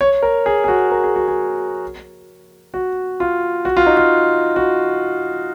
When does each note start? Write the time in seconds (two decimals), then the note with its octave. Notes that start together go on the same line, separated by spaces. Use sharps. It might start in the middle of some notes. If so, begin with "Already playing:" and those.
0.01 C#5
0.22 A#4
0.46 G#4
0.64 G#4
0.68 F#4
0.91 A#4
1.04 G#4
1.16 F#4
1.28 G#4
2.74 F#4
3.20 F4
3.65 F#4
3.77 F4
3.86 D#4
3.97 F4
4.56 F#4